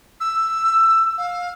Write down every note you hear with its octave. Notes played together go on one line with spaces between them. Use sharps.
E6
F5